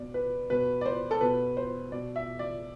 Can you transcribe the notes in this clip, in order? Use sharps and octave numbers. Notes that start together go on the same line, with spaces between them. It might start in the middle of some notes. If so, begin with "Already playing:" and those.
Already playing: B2 D5
B4
B2 B4
D5
C5
A4
B2 B4
C5
B2 D5
E5
D5